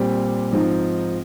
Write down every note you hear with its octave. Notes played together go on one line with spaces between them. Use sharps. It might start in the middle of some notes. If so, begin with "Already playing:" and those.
Already playing: A#2 G3 C4 G4
G#2 F3 C4 D#4